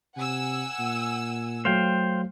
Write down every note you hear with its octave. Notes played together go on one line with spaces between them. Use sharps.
C3 F#5 G#5 E6
A#2
F#3 A3 C5 F5 G5